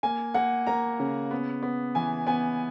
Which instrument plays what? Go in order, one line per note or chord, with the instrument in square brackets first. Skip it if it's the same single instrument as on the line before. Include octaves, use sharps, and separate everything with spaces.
[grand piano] A#3 G#5
A#3 F#5
A#3 A#5
C#3
B3
B3
E3 G#5
B3 G#5